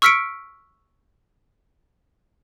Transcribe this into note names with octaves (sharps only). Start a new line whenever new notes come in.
C#6 E6 F6 B6 C#7 D7